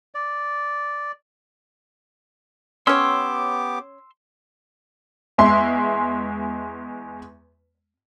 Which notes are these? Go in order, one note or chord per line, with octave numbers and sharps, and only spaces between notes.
D5
B3 C#4 G4 C#5 C6 D6 E6
E2 G#3 E5 C6